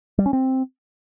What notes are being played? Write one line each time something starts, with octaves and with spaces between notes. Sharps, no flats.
G3
C#4
C4